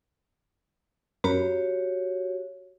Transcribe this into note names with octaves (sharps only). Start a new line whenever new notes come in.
F#2 F#4 G4 A#4 C#5 B5